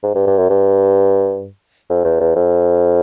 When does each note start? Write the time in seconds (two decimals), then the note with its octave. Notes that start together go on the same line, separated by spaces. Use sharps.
0.03 G#2
0.15 G2
0.27 G2
0.38 F#2
0.50 G2
1.90 F2
2.05 E2
2.20 E2
2.36 F2